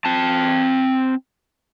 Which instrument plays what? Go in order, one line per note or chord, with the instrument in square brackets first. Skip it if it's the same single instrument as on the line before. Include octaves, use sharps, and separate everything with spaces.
[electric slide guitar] C4 A5